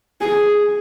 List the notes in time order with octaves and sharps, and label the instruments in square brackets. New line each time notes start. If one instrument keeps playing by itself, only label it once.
[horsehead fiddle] G#4